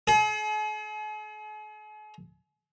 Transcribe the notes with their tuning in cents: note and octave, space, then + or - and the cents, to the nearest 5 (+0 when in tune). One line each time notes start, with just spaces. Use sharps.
G#4 +45